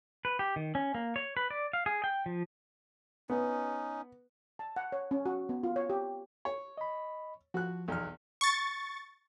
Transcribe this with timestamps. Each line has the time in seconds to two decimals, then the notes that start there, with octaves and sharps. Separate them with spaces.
0.25 B4
0.39 G4
0.56 D#3
0.75 C#4
0.95 A#3
1.16 C#5
1.37 B4
1.50 D5
1.73 F5
1.86 G#4
2.04 G5
2.26 F3
3.30 B3 C#4 D#4
4.59 A5
4.76 F#5
4.92 C#5
5.11 C#4
5.26 F#4
5.49 B3
5.63 F4
5.76 C#5
5.90 G4
6.45 C#5
6.78 D#5 B5
7.54 F3 F#4 F#6
7.88 B1 E2 F6
8.41 C#6 A6